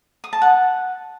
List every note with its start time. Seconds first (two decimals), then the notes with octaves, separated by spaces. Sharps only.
0.24 D#6
0.33 A5
0.42 F#5